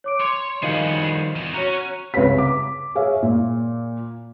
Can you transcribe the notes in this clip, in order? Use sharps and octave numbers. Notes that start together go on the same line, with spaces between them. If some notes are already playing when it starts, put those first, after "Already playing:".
C#5 D6 D7
C#5 C6
D#3 F3 G3 G#4 D#5 F5 F#5
E2
C#4 F#4 C#5 A#5
C2 C#3 B4 C#5 B6
D6
G#4 C#5 E5 F5
A#2